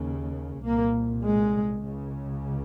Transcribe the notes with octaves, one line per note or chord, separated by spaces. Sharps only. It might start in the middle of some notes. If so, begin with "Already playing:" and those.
Already playing: D#2 C#3
C2 A#2 A#3
G#3
C#2 C#3